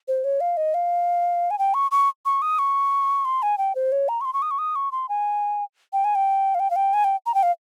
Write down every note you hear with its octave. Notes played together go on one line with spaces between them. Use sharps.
C5
C#5
F5
D#5
F5
G#5
G5
C#6
C#6
C#6
D#6
C#6
C6
G#5
G5
C5
C#5
A#5
C#6
C6
C#6
D#6
C#6
D#6
C#6
C6
G#5
G5
G#5
G5
F5
G5
F5
G5
G#5
G5
A#5
G5
F5